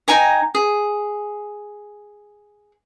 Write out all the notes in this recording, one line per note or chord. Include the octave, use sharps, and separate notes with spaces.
D#4 G5 G#5 A#5
G#4